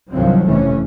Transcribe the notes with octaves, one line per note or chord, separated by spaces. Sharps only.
C2 G2 D#3 F3 F#3 C4
F1 C3 E3 A3 C#4